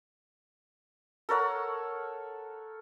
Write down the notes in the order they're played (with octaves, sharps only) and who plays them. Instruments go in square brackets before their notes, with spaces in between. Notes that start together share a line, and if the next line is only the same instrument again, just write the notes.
[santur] A4 A#4 C#5 F#5